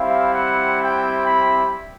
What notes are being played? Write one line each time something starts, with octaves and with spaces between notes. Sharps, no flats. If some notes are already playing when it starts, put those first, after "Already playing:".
Already playing: G3 C4 E4 F5
F#5
G5
B5